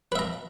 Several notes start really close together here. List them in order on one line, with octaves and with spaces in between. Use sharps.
B4 E5 A#5